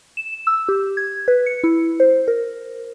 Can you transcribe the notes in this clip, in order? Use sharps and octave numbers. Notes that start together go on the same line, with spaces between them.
E7
E6
G4
G#6
B4
C#7
E4
C5
A#4